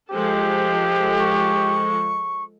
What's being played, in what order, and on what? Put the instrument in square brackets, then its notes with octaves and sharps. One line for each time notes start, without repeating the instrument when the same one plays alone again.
[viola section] F3 G#3 A4 [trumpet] G4 [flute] C5
[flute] C#6